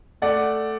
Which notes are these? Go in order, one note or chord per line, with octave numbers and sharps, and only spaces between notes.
A3 D5 F#5